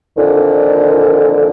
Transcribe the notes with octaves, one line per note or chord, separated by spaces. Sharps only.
F2 A#2 D3 D#3